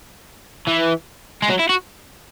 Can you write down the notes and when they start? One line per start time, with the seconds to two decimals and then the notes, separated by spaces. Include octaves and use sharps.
0.67 E3
1.42 G#3
1.49 F#3
1.59 E4
1.69 F#4